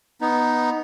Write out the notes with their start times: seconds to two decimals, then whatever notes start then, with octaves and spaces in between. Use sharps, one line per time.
0.21 B3 D#4